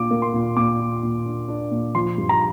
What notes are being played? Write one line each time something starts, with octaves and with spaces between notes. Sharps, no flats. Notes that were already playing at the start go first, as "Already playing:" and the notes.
Already playing: A#2 D4 F4 D6
A#3
C6
A#2
A#2 D6
F4
A#2
D4
D4
A#2
F3 C6
G2
A#5